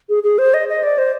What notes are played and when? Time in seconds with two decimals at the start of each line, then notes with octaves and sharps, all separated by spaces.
0.09 G#4
0.23 G#4
0.38 C5
0.54 D#5
0.68 D#5
0.83 D5
0.98 C5